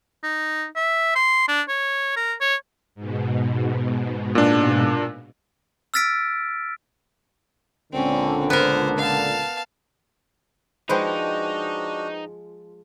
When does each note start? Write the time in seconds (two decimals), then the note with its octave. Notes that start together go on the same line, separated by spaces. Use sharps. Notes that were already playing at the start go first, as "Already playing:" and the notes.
0.23 D#4
0.76 E5
1.15 C6
1.48 D4
1.69 C#5
2.16 A#4
2.41 C#5
2.95 G#2 B2
4.35 A#2 D4
5.94 E6 F6 A6 B6 D7
7.93 C#2 A#2 D3 C4 C#4
8.50 B3 A#4 C5
8.98 F5 A5
10.89 F3 G#3 D4 D#4 F#4 B4 C5 G5